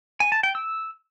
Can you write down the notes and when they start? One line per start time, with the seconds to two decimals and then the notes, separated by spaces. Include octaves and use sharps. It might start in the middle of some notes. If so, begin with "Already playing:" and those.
0.20 G#5
0.32 A5
0.43 G5
0.55 E6